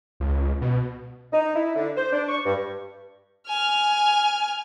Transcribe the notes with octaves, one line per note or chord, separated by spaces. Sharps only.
C#2
B2
D#4
E4
D3
C5
D4
C#6
G2
G#5 F6